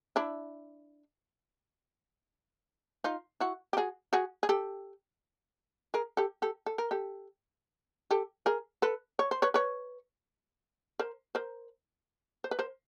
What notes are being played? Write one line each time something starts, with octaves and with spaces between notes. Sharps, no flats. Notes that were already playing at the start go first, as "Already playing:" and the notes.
D4 E4
D#4 F4
E4 F#4
G4
F#4 G#4
F#4 G#4
G#4
G4 A4
G#4 A#4
G4 A4
G4 A4
A4
A#4
G4 A4
G4 A4
G#4 A#4
A4 B4
C#5
C5
B4 C#5
B4 C#5
A#4 C5
A#4 C5
C5
B4
A#4 C5